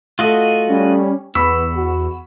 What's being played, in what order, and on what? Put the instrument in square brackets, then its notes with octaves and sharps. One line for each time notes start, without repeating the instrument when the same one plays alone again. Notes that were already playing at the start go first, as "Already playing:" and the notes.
[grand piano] A3 [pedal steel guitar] F4 F#4 D#5
[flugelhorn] G3 [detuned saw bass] C#4
[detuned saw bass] E2 [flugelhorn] B3 [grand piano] B5 C#6 B6 [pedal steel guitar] E6
[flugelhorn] F#4